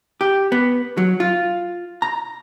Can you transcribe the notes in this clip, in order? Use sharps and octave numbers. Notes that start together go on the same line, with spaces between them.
G4
B3
F#3
F4
A#5